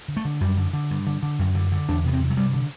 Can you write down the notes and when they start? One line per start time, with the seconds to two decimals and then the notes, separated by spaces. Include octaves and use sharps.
0.08 D3
0.17 A3
0.25 D3
0.41 F#2 G3
0.57 D3
0.73 D3
0.91 G2
1.07 D3
1.23 D3
1.39 F#2
1.55 D3
1.72 D3
1.89 E2 D4
2.05 C3 B3
2.13 C4
2.21 C3
2.30 F#3
2.37 G2 G3
2.54 D3